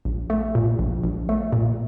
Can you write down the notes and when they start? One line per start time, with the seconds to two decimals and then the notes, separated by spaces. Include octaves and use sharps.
0.05 A#1
0.30 A3
0.55 A#2
0.79 A#1
1.03 A#1
1.29 A3
1.53 A#2